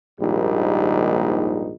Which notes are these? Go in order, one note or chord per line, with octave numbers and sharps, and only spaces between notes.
A#1 D#2 G#2 D#3 G3 D#4